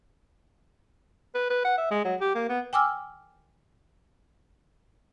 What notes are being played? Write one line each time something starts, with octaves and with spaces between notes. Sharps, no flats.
B4
B4
F#5
E5
G#3
F#3
G4
A#3
B3
G5 G#5 D6 E6 F6